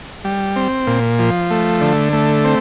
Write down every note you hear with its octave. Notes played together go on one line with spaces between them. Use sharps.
G3
C4
A#2
F3
A3
D3
A3
C4